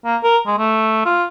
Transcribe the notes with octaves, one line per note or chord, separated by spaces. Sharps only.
A#3
A#4
G#3
A3
F4